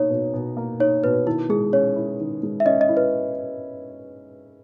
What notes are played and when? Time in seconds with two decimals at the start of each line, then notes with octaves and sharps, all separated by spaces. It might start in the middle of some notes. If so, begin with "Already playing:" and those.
Already playing: B2 A#3 D#4 C#5
0.10 B2
0.34 B2
0.57 A#3
0.80 D#4 C#5
1.04 B2 B4
1.26 D#3 E4
1.49 G#3 G#4
1.73 C#4 C#5
1.96 E4
2.19 D#3
2.43 G#3
2.60 E5
2.66 C#4 D#5
2.81 D#5
2.88 E4
2.97 B4